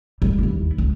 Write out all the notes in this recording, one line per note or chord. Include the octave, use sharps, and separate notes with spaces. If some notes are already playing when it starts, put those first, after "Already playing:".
G3
D#2 E4
C#2